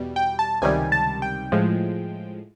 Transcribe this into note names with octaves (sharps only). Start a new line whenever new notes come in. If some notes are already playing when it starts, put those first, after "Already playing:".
Already playing: E2 B2 G3
G5
A5
C#2 C3 D#3 G3 G#5
A5
G5
A2 F3 G#3